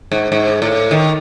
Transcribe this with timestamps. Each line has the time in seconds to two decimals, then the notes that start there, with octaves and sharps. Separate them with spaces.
0.12 G#2
0.32 G#2
0.62 A2
0.91 D#3